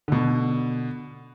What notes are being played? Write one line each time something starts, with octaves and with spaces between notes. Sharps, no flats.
B2 D3